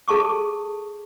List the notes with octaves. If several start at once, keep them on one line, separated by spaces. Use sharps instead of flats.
G#4 A4 A5 C#6 D6